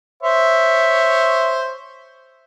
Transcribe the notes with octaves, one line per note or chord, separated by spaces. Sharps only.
C5 C#5 E5